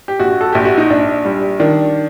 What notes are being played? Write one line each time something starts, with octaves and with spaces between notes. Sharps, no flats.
G4
A#1 F#4
A4
A#1 G4
F#4
D#4
A#1 D4
G3
D#3 D4